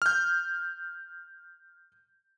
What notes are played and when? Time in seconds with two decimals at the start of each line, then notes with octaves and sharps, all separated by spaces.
0.02 F6 G6